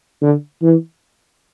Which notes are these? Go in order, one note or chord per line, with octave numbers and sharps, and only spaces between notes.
D3
E3